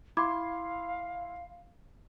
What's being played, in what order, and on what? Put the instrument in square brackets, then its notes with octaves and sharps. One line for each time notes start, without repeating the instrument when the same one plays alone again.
[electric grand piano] E4 C6 [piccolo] F5 [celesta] B5 D6 G#6